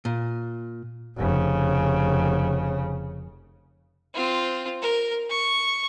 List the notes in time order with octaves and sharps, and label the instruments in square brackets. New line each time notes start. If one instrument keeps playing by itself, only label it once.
[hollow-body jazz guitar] A#2
[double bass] F1 C#3
[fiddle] C4 F4
A#4
C#6